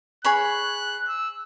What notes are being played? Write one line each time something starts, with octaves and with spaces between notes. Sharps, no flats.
G#4 C#5 B5 F#6
E6